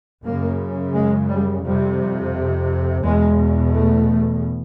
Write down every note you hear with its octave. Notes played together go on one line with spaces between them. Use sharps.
F#2 C#3 A#3
G#3
G3
F2 C3 G3
E2 B2 G#3
A3